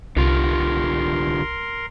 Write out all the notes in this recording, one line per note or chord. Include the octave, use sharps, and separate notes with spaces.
C2 D3 F4 G4 A#4 C6